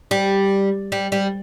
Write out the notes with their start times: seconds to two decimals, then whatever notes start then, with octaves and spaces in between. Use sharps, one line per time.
0.11 G3
0.92 G3
1.12 G3